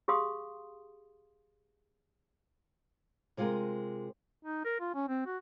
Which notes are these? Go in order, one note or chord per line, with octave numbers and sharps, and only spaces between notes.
G4 G#4 F5 C6 D#6
C3 G#3 F4 G4 G#4 A#4
D#4
A#4
F4
C#4
C4
F#4